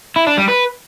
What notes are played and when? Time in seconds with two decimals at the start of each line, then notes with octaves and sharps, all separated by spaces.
0.16 E4
0.27 D4
0.37 G3
0.48 B4